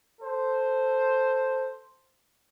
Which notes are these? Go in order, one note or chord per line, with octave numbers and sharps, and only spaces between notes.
A4 C5